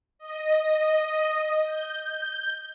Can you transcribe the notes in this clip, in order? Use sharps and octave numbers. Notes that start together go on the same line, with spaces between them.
D#5
G6